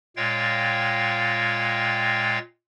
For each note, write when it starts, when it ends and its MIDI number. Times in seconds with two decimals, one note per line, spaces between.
0.17 2.39 46
0.17 2.39 56
0.17 2.39 73
0.17 2.39 77
0.17 2.39 79
0.17 2.39 93